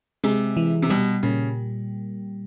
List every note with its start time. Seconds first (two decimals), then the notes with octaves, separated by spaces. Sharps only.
0.24 C3 G#3
0.57 E3
0.82 C3
0.90 B2 G3
1.23 A#2 C#3